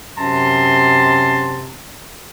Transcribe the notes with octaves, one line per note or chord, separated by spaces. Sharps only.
F#2 C3 A5 A#5 C6